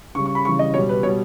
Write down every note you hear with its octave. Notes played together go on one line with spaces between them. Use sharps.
C#3 G3 C#6
C#6
B5
C#3 E3 G3 C#6
D#5
B2 G3 C#5
B4
B2 G3 C#5